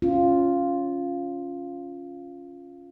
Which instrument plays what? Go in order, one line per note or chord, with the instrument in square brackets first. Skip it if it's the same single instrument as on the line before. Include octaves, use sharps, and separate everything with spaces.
[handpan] C#4 F4